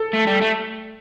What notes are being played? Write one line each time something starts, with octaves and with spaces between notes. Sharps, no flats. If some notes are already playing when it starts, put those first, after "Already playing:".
Already playing: A4
A3
G3
A3